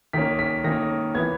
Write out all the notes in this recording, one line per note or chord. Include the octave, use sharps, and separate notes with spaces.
D#3 A#3 C#4 B6
B6
D#3 A#3 C#4 A#6
E3 B3 G#6